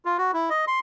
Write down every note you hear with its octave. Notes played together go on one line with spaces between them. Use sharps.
F4
F#4
E4
D#5
C6